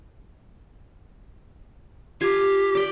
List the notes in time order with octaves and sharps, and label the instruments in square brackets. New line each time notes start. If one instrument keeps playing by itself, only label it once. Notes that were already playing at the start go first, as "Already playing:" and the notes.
[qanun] F4 G#5 [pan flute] G4
[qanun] D5 G5